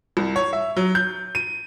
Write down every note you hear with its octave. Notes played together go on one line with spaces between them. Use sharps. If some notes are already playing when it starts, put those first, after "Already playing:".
C2
C#5
E5
F#3
G6
D#7